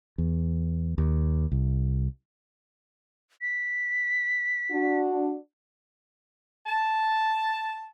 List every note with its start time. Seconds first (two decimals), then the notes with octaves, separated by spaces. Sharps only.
0.18 E2
0.98 D#2
1.52 C2
3.41 B6
4.71 D4 F#4
6.66 A5